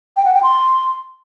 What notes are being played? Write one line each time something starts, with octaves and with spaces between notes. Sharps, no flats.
G5
F#5
G5
C6